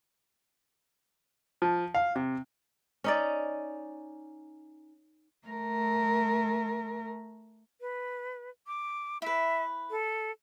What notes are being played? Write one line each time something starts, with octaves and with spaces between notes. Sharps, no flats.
F3
F5
C3
C#4 D#4 D5
A3 A#4
B4
D6
E4 B4 E5
A4